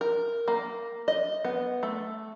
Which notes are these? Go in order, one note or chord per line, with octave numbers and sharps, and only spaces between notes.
A#4
A#3
D#5
B3
A3